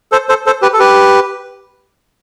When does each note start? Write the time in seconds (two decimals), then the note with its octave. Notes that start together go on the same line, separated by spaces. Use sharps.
0.12 A4 C5
0.29 A4 C5
0.46 A4 C5
0.62 G4 B4
0.74 A4
0.79 G4 B4